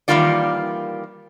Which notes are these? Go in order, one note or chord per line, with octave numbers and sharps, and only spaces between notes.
D#3 E3 G3 A#3 F4 D5